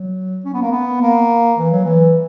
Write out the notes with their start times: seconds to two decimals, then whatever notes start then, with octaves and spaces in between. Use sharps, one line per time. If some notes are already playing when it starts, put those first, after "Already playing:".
Already playing: F#3
0.45 C#4
0.54 B3
0.62 A#3
0.72 B3
1.02 A#3
1.59 E3
1.72 F#3
1.85 E3